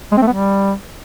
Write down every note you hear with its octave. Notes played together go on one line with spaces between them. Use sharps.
G#3
C4
A3
B3
G3